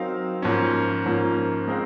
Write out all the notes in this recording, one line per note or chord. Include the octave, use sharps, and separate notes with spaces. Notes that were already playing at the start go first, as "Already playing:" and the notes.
Already playing: F#3 C4 D#4 A#4 F5
G#2 F3 A#3 C#4
G#2 F3 A#3 C#4
G#3 C4 D#4 A#4 F5